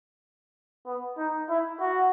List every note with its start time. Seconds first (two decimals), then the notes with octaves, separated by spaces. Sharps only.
0.86 B3
1.18 D#4
1.49 E4
1.81 F#4